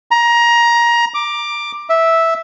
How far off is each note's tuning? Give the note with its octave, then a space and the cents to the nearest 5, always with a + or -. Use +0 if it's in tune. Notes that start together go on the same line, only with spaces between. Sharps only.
A#5 +20
D6 +10
E5 -5